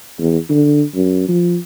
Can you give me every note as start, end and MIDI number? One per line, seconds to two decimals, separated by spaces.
0.20 0.38 40
0.50 0.84 50
0.95 1.28 42
1.29 1.57 53